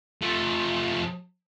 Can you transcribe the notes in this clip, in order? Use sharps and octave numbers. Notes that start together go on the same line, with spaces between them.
F3 A3